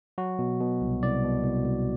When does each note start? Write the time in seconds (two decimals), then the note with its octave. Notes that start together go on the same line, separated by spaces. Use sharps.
0.18 F#3 F#4
0.39 B2
0.60 B2
0.81 C2
1.02 C2 D5
1.24 B2
1.45 C2
1.66 C2